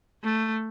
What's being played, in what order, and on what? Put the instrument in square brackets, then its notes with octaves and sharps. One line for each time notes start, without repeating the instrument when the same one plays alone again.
[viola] A3